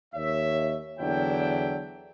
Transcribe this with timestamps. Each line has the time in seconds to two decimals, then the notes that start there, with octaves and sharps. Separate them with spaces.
0.14 D#2 C#5 E5
0.99 E2 D3 F#3 D4 E4 G5